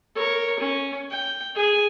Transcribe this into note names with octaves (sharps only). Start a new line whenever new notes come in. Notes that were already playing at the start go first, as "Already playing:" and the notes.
A#4 C#5
C#4
G5
G#4 G#5